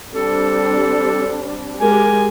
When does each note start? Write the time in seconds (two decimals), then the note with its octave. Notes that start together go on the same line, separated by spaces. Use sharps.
0.13 G3 C4 D4 A4
1.80 G#3 G4 A#4 G#5